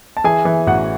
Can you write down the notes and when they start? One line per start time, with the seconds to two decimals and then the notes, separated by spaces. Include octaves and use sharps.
0.17 A5
0.24 E3 G#4 G#5
0.45 E3
0.67 A1 F#4 F#5